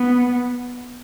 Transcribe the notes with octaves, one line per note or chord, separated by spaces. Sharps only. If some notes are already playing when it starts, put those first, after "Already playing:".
Already playing: B3